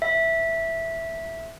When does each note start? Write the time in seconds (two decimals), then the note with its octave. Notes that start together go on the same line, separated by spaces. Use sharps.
0.02 E5